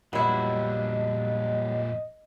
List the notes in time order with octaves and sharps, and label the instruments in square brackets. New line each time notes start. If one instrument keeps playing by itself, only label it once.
[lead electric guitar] F2 A#2 [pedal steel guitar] F#3 G3 D4 [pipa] B3 E4 [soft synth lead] D#5